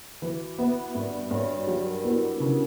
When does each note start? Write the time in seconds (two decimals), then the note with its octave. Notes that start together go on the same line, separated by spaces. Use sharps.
0.22 E3 F#4
0.58 B3 E5
0.95 G2 D5
1.31 G2 C#5
1.58 F#4
1.67 F#3 G4
1.86 A#4
2.04 B3 E4
2.21 D4
2.40 C#3 C#4